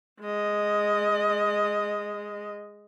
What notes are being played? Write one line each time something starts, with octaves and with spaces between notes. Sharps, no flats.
G#3 D#5